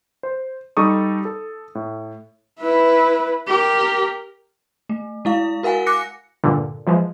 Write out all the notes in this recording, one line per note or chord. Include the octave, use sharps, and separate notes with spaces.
C5
G3 D#4 A4 C#6 D#6
A4
A2
E4 B4
G4 A#4
A3
G#3 E4 F5
F#4 A#4 F5 F#5 G#5
D6 F#6 A#6 C#7
G2 A#2 D3
E3 F3 G#3